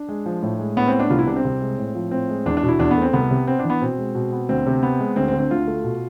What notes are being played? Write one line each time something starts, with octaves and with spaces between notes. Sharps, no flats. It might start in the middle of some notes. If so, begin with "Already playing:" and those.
Already playing: D4
G#3
F3
A2
G#3
A2 B3
C4
B3
D4
C2 F4
E4
C3 D4
C4
C2
G#3
A2
F3
A2 C4
G#3
E2 D4
D4
B2
E4
E2 D4
B3
A3 C4
C2 B3
C3
B3 C4
D4
E3
B3
B2 C4
G#3
B2
B3
D2 C4
C3
B3
G#3
D2 C4
C4
D3
C4
D2 F4
A3
B2